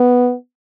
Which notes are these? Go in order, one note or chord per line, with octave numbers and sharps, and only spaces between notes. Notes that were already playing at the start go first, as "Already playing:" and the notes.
Already playing: B3